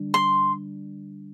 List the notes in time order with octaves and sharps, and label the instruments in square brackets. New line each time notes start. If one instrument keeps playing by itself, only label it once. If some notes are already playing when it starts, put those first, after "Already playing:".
Already playing: [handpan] D3 G3 D4
[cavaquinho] C6